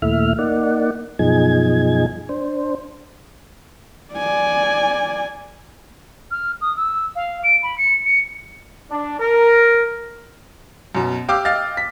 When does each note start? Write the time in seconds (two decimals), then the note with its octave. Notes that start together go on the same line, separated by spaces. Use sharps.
0.02 D#2 A#2 A3 E4 E5 F6
0.39 A#3 D#4 D5 F#5
1.19 F#2 B2 F3 D#4 G#4 G#6
2.29 D4 C5
4.14 D5 G#5
6.31 F6
6.61 D#6
6.77 E6
7.16 F5
7.44 D7
7.63 B5
7.78 C#7
8.06 C#7
8.91 D4
9.20 A#4
10.95 F#2 B2
11.28 G4 F5 G5 D6 E6
11.45 D#5 F5 G5 F6 A6
11.77 B6